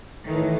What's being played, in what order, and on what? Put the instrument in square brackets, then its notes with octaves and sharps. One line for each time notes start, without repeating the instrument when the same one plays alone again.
[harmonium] A2 E3 A3 [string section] D#3